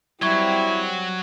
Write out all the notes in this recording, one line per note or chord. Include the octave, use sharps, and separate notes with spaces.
F#3 G3 C4 E4 C#6 G#6